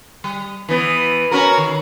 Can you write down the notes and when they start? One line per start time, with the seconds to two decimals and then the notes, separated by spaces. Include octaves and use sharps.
0.24 G3
0.69 E3 B3
1.31 C#4 F#4 A#4
1.58 D#3